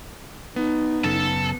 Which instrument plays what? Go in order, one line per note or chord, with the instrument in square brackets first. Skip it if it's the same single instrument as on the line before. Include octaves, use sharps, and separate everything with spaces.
[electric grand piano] B3 [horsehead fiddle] D#4
[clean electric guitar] F#2 C#3 [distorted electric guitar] A4